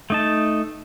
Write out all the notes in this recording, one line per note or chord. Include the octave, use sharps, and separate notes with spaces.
A3 D#4 A5